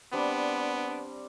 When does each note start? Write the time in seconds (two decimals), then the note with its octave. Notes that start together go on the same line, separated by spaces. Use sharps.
0.13 G3 B3 C4 D4